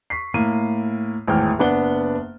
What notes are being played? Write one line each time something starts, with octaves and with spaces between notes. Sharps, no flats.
C#6 B6 C7
A2 A#3 D#7
G#1 E2 A2 G5 F6
F#1 B3 D4 F#5 G7